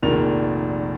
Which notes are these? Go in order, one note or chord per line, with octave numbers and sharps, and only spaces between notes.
F1 A#1 A#2 D#3 G#3 F7